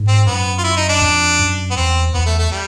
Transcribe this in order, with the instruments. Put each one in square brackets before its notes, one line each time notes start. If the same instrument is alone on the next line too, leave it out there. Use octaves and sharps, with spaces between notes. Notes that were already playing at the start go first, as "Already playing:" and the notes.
Already playing: [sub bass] G#2
[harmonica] C4
[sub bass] F#2 [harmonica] B3
[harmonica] F4
E4
D#4
D4
[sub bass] F2
F#2
[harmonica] B3
[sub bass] E2 [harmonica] C4
[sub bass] E2 [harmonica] B3
[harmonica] A3
A3
G3